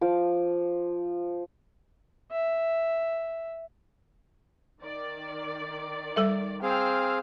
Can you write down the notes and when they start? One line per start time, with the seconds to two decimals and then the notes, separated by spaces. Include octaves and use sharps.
0.01 F3 D6
2.32 E5
4.82 D#3 D5
6.16 G3 A4 E5
6.63 C4 G#4 F5 G5 E6 F6